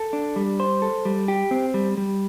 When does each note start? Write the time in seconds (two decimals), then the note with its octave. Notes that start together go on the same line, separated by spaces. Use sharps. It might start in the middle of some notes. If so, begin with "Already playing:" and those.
Already playing: A4
0.13 D4
0.36 G3
0.60 C5
0.82 A4
1.05 G3
1.28 G4
1.51 C4
1.74 G3
1.97 G3